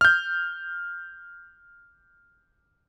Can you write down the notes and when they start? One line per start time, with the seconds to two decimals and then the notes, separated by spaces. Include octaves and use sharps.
0.01 F6 G6